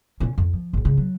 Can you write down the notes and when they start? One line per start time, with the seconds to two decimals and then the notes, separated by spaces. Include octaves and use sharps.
0.20 A#2 C#4
0.38 F2
0.53 F3
0.73 G#1 A2
0.85 C#3 G#3
0.97 F#3